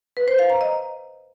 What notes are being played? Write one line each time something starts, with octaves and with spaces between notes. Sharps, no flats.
B4
C5
F5
A#5
D#5